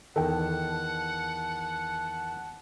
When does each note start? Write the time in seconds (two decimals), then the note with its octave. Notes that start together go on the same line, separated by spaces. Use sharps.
0.16 E2 D#3 A4 F#5 G5 A5